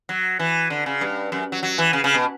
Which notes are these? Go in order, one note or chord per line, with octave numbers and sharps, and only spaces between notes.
F#3
E3
D3
C#3
G2
F#2
F#3
F#3
E3
C#3
C#3
B2